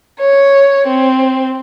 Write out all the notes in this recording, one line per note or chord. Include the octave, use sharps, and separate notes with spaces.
C#5
C4